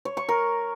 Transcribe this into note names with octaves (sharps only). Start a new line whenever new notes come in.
C#5
C#6
A#4